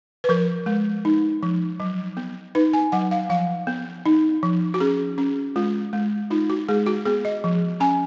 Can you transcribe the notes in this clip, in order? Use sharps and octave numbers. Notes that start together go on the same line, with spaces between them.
B4
F3 A#4
G#3
D#4
F3
F#3
B3
D#4 B4
G#5
F#3 F#5
F5
F3 F5
B3
D#4
F3
F#4
C#4 G#4
C#4
G#3 F4
G#3
D#4 F4
F#4
G#3 G#4
F#4
B3 G#4
D#5
F3
C#4 G#5